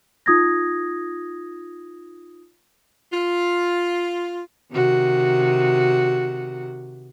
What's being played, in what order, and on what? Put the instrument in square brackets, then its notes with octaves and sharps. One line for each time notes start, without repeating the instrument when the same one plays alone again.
[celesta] D#4 F4 D#6 G#6 A#6
[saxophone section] F4
[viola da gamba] C3 D#3 F#4